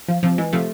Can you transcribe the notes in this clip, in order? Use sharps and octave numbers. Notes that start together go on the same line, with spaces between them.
F3
C3 F3
E3 G#3
C3 F3 A3